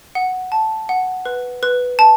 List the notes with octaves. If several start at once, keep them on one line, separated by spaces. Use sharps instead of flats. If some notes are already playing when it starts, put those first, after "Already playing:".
F#5
A5
F#5
B4
B4
A5